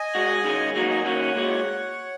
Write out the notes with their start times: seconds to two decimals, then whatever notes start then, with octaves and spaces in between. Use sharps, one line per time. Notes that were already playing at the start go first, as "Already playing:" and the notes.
Already playing: D#5 G#5
0.15 G#3 F#4
0.44 D#3 G#3 C#4 G#4
0.75 F#3 A#3 D#4 F#4 D#5 G#5
0.90 D#5 G#5
1.04 D#3 A#3 C#4 F#4 C#5 F#5
1.35 A#2 G#3 F#4